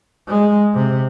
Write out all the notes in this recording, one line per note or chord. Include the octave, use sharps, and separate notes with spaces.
G#3
C3